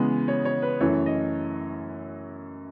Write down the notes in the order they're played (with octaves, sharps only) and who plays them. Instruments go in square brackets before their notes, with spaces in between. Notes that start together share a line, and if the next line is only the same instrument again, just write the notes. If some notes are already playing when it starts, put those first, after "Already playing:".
Already playing: [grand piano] C#3 E3 G#3 B3
C#5
C#5
B4
F#2 E3 A3 C#5
D#5